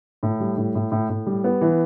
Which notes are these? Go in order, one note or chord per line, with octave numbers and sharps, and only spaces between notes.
A2
G3
A2
A2
A2
A2
G3
B3
E3